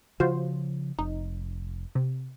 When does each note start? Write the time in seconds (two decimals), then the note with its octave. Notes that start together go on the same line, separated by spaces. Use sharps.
0.20 C#3 F3 F4 F#4 C5
0.99 F1 D#4
1.95 C3